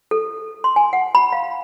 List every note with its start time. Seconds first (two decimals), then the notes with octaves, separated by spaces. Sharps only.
0.11 A4
0.64 C6
0.76 G#5
0.93 F#5
1.15 B5
1.33 F5